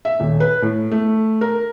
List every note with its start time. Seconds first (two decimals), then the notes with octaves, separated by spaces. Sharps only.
0.05 E5
0.20 D#1
0.40 B4
0.62 A2
0.91 A3
1.41 A#4